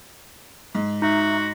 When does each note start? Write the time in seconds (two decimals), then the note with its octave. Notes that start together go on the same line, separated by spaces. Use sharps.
0.75 G#2
1.02 D#4 F#4 E5 A#5